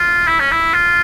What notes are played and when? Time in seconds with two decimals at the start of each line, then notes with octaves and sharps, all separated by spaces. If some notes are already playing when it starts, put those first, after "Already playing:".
Already playing: F4
0.28 E4
0.40 C#4
0.52 E4
0.74 F4